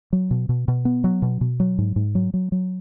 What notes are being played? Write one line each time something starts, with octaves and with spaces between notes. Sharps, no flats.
F#3
B2
B2
B2
B3
F#3
B2
B2
F#3
G#2
G#2
F#3
F#3
F#3